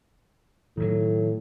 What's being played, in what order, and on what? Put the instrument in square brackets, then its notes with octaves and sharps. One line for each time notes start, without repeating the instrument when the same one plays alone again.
[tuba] A2 [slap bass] D#3 E3 F#3